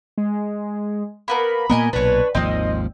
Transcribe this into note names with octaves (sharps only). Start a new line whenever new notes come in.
G#3
A#3 B3 A#4 B5
A#2 A#3 B3 A#4 D#5 G#5
B1 A#2 D4 B4 C#5
G#1 D#2 F3 C4 D#5